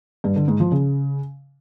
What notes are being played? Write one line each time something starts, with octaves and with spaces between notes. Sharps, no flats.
G2
D3
G#2
F3
C#3